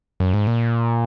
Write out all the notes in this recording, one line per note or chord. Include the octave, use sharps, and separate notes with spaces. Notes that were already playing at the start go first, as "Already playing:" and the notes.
F#2
G#2
A#2